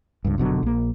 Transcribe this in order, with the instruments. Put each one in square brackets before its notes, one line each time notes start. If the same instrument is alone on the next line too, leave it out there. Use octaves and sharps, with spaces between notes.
[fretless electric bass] C#2 G2
F1 B2 D3 F#3
A#1 A#3